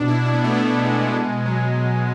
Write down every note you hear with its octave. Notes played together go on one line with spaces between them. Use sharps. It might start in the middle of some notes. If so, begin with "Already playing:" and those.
Already playing: B2 D4
E4
B2 D4
B3
A3
B2 B3
A3
B2 G#3
B2
B2 F#3
F#3
B2